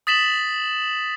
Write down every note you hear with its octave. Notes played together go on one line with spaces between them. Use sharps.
D#6 A6 B6 E7 F#7